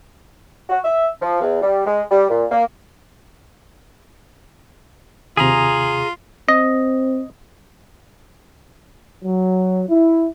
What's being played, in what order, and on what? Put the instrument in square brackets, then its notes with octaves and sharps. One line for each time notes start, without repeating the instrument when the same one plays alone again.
[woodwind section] F#4
E5
F3
E2
G3
G#3
G3
A#2
A#3
[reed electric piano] D#2 C3 [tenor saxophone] F4 [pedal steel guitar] G#4 A#5
[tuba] C4 [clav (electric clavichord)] D#5
[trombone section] F#3
E4